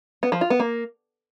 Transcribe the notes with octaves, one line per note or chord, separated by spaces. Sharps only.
B3
F3
F4
B3
A#3